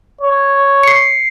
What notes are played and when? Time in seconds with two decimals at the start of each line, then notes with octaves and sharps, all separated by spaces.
0.20 C#5
0.83 C7 C#7